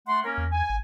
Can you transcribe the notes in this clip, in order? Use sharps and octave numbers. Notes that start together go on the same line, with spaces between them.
A3 F#5 C6
A#3 C#4 A#4
E2
G#5
G#1